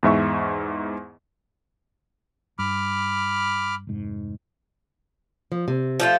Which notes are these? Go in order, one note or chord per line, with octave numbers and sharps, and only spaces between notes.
E2 G#2 E5 C#6
G2 B5 D6 F6
F1 G#2
F3
C3
F3 A3 F4